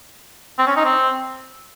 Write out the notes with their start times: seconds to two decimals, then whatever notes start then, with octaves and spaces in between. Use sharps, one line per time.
0.58 C4
0.67 C#4
0.76 D#4
0.85 C4